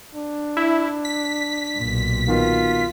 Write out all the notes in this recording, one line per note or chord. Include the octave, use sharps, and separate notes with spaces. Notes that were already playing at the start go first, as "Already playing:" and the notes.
D4
E4
B6
B1 A#2
B2 D#3 F4